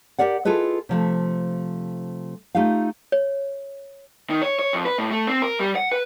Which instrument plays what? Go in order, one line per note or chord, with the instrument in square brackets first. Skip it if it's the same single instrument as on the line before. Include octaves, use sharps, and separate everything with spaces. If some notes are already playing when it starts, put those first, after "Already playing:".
[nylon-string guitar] G4 G#4 A#4 D5 F#5
E4 F4 G#4 A4 B4 D#5
C3 F3 A3
A3 D#4 F4 G4 F5
[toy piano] C#5
[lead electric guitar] D#3
C#5
C#5
F2
B4
A2
A3
C4
A#4
G3
F#5
B4